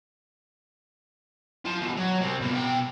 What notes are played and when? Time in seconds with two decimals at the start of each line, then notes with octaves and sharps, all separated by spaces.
1.65 F4 A5
1.82 B2 E3
1.97 F#3
2.21 C2 C4
2.41 B2 A#3
2.55 B2 G5